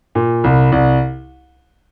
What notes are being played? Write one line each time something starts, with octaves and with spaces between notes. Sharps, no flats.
A#2
C2
C2